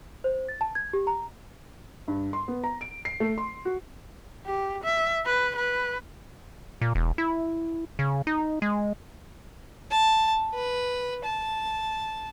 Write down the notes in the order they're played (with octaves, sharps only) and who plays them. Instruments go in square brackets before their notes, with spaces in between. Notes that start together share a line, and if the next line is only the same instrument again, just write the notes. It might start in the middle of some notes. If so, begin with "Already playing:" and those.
[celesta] C5
A6
A5
G#6
G4
A#5
[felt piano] G2
C6
B3
A#5
D7
C7
A3
C6
F#4
[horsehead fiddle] G4
E5
B4
B4
[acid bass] A#2
E1
E4
C#3
D#4
G#3
[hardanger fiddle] A5
B4
A5